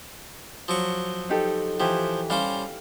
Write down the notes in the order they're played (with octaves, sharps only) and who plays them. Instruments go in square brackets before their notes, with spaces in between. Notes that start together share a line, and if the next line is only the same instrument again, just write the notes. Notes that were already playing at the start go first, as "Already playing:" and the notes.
[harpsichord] F3 F#3 C#6
[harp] D#4 G4 A4
[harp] E3 G4 [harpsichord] F3
[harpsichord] G3 C#4 C5 [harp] F5